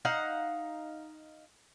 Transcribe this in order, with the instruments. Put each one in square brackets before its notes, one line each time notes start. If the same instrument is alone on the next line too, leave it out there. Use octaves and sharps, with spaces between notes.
[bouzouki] D#4 F5 F#5